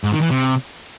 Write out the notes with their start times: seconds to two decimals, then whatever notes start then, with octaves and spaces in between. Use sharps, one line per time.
0.04 G#2
0.13 D#3
0.22 E3
0.31 C3